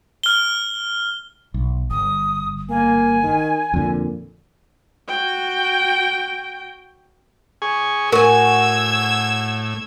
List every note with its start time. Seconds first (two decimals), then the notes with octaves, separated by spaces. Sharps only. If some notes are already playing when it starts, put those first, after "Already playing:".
0.24 F6 G7
1.54 B1
1.91 G1 D#6
2.70 A#3 G#5
3.23 D#3
3.74 F2 A#2 D3
5.08 F#4 G5
7.62 G#4 G#5 C#6
8.12 A2 F#4 A#4 G#5 E6 G#6